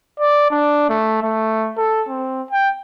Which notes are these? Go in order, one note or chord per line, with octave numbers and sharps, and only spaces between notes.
D5
D4
A3
A3
A4
C4
G5